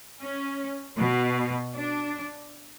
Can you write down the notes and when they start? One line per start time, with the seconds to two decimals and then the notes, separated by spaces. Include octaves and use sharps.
0.21 C#4
0.98 B2
1.73 D4